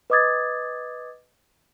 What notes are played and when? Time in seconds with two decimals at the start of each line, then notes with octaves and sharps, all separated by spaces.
0.10 B4 D#5 D6 D#6 G#6 A6